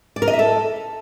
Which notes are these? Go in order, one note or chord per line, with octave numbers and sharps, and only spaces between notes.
D5
A#4
D#5
E5
A4